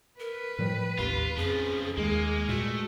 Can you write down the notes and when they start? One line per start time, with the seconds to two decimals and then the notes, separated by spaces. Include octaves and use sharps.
0.20 A#4 B4
0.59 A2 F3 G3
0.99 A1 D#2 F4 G4
1.37 F2 C#3 F3 G#4
1.97 D#2 G#3 A#3
2.49 G2 A#2 A3 F#4